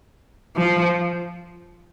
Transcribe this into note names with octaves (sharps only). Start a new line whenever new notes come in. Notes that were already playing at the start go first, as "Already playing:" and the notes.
F3